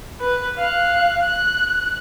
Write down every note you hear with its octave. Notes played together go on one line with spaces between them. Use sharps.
B4
F5 F#6
F#6